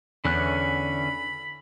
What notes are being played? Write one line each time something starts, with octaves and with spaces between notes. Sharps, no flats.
E2 D3 C#4 B5 F#6